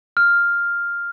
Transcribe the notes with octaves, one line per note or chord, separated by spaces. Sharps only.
F6